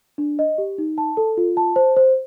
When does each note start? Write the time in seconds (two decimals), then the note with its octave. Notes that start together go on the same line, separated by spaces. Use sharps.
0.18 D4
0.39 D#5
0.58 G4
0.78 D#4
0.98 A5
1.17 A4
1.37 F4
1.57 A5
1.76 C5
1.97 C5